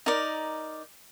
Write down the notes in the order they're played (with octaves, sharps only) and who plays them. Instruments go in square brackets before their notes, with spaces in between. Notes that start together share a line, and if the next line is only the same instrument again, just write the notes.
[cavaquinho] D#4 A#4 D5